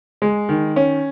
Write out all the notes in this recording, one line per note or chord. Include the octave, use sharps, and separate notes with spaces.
G#3
D#3
C#4